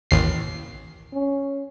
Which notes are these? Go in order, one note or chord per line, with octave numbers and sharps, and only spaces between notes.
A1 D#2 C7
C#4